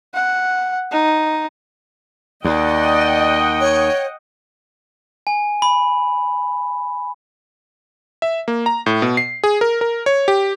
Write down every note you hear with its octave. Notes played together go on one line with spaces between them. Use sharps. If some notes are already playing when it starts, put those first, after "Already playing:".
F#5
D#4
D#2 D5 D#5 F#5 G5
C#5
G#5
B5
E5
A#3
A#5
A2
B2
C7
G#4
A#4
A#4
C#5
G4